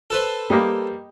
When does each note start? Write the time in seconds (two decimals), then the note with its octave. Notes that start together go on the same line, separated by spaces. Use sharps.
0.10 A4 B4 C5
0.50 G3 A#3 G4 D#5